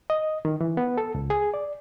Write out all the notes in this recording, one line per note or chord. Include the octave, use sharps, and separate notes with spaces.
D#5
D#3
E3
B3
A4
C#2
G#4
D5